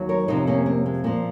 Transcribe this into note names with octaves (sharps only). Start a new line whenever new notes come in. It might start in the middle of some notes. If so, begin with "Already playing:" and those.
Already playing: D#2 D#3 F#3
A#4 C#5
F2 C3 F3 C4 D#4
A#3 C#4
A#3
G#3
A#2 F3 A#3